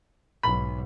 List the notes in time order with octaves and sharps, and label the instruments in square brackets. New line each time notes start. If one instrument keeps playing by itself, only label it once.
[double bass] B1 G#2 [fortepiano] B5